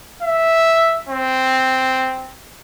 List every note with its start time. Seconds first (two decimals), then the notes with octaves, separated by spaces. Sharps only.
0.22 E5
1.09 C4